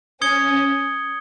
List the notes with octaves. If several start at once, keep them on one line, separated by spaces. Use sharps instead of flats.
C#4 D#6 G#6 C#7 G7